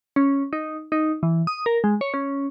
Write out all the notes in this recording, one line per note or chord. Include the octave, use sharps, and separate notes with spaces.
C#4
D#4
D#4
E3
D#6
A#4
G#3
C#5
C#4